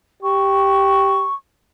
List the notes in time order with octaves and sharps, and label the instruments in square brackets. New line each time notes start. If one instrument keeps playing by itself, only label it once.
[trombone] G4 [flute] C#6